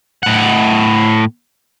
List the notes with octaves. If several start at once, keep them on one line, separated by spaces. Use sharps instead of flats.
A2 F#5